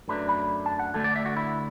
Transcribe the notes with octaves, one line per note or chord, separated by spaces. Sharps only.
F#2 F#3 A3 D4 B4
B5
A5
F#5
D2 D3 A3 D4 A4
D5
E5
F#4
E4